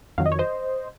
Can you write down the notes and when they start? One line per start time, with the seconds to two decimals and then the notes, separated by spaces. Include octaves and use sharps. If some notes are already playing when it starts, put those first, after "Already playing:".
0.18 F2 D#3 F#3 F5
0.26 D#5
0.32 C#5
0.39 C5 D#5